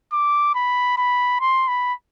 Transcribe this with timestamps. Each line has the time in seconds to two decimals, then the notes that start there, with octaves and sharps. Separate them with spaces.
0.13 D6
0.55 B5
0.98 B5
1.40 C6
1.68 B5